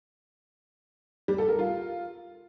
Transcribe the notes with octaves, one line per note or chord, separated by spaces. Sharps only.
G3
A4
A#4
F4